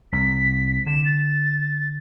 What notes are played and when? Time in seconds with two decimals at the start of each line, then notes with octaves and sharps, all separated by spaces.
0.12 C2 B6
0.86 D3 E7
1.05 A6